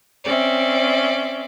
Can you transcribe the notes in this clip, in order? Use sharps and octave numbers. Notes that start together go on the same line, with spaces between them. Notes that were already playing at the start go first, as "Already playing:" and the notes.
C4 C#4 D5 E5